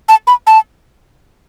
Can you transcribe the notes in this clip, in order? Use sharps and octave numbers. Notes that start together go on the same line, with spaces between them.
A5
B5
A5